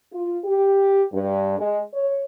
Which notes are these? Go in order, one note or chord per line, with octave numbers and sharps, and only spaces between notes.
F4
G4
G2
G#3
C#5